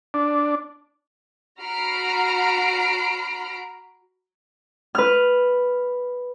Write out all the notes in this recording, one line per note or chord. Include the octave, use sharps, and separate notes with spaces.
D4
F#4 A#5 B5 F6 C7 D7
B4 F6